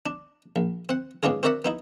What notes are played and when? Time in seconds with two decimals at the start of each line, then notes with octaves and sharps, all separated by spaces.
0.06 D4
0.56 A#1
0.89 C4 F#5
1.23 G#2 B3 C#4 D4 F4 G#4
1.43 C4 F#4 A#4 D5 E5 F#5
1.65 B3 D#4 E4